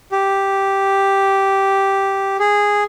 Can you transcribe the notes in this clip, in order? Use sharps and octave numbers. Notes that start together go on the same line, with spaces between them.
G4
G#4